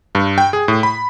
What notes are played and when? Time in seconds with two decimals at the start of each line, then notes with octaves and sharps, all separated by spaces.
0.15 G2
0.38 G5
0.53 G#4
0.68 A2
0.83 B5